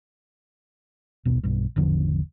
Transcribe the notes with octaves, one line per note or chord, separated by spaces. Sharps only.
D#1 B1 B2
B1 G2
G#1 E2 D3 F3